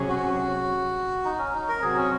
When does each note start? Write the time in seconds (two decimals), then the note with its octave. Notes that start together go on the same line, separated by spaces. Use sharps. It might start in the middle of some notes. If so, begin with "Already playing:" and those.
Already playing: C3 F#3 C#4 G#4
0.09 F#4
1.25 D#4
1.39 C#4
1.54 D#4
1.69 A#4
1.82 C3 F#3 C4 F#4 G#4
1.96 C#4